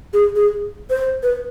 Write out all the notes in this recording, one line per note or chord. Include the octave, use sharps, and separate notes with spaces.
G#4
G#4
C5
B4